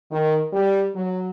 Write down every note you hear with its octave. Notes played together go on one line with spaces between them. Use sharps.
D#3
G3
F#3